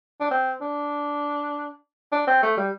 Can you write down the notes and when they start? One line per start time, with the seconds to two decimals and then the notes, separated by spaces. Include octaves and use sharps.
0.21 D4
0.31 C4
0.61 D4
2.12 D4
2.27 C4
2.43 A3
2.57 G3